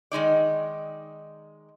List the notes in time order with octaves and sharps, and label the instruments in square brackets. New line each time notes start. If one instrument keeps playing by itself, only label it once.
[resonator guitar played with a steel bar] D#3 G#3 D#4 D5